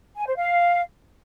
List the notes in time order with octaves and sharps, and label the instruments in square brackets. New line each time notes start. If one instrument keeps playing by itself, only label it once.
[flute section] G#5
C5
F5